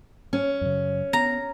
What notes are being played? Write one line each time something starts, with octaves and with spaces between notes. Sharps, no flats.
C#4
F#2 C#3
B3 A#5